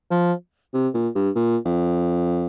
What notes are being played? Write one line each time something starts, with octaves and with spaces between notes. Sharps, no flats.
F3
C3
A#2
G2
A#2
F2